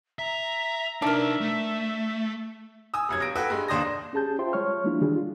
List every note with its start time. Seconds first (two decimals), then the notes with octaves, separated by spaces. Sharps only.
0.19 E5 A#5
1.02 D4 D#4 A#4 B4 E5
1.41 A3
2.94 G#5 D#6 E6
3.09 F1 F#2 G#6
3.20 G1 A#6 D7
3.35 F#4 A4 B4 G5 E6
3.50 G2 G#3
3.68 D#2 D4 C5 D#6 A#6
4.13 C#4 G4 G#4 A5 G6
4.39 F4 C5 E5 G5 A5 C6
4.53 G3 G#3 C#5 C#6 F6
4.84 F3 G3 A#3 D4 E4 F4
5.02 D#3 E3 G3 D4 F#4 G#4
5.16 F4